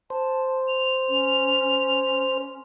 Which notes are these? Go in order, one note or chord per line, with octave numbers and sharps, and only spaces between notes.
C5 A5
F7
C#4